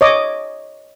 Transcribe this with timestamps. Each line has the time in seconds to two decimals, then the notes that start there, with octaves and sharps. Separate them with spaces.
0.01 C#5 D#5 D6